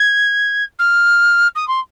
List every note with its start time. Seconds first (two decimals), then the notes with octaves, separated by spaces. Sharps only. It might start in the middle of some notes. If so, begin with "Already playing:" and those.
Already playing: G#6
0.79 F6
1.55 D#6
1.67 C6